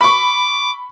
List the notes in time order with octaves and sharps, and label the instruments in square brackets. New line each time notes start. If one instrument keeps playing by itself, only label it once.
[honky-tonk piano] B5 C#6 [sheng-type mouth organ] D6